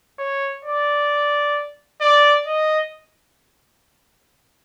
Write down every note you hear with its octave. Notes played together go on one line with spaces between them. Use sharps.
C#5
D5
D5
D#5